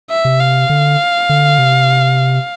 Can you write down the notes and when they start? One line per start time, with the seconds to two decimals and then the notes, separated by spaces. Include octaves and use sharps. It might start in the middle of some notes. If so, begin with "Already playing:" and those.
0.10 E5
0.25 C3
0.40 F5
0.70 D3
1.29 D3
1.59 C3